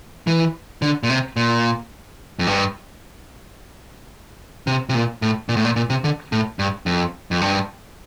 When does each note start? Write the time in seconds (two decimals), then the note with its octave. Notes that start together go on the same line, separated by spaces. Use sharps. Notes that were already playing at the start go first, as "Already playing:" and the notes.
0.27 E3
0.82 D3
1.03 A#2
1.10 C3
1.36 A#2
2.39 F2
2.47 G2
4.67 C3
4.89 C3
4.94 A#2
5.22 A2
5.49 A#2
5.57 A2
5.65 A#2
5.76 A#2
5.90 C3
6.04 D3
6.32 A2
6.59 G2
6.86 F2
7.31 F2
7.41 G2